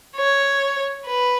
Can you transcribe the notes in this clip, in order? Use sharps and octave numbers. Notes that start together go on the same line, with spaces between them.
C#5
B4